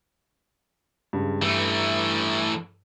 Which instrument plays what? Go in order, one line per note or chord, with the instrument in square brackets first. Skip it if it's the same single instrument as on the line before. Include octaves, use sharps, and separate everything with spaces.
[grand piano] G2 C#3 G#3
[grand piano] G2 [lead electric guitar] E3 A3